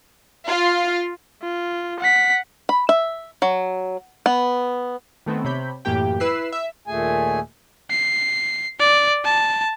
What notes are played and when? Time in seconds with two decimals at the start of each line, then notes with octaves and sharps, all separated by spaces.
0.47 F4
1.42 F4
2.00 F#5 B6
2.69 B5
2.89 E5
3.42 F#3
4.26 B3
5.26 D#3 A3 B3 C4
5.45 C3 C#5 B5 G6
5.85 F#2 A2 E3 A#3 G4 G5
6.20 E4 B4 E6 F#6 B6 C7
6.52 E5
6.87 D#2 A#2 A3 G#4 G#5
7.90 C7
8.79 D5
9.24 A5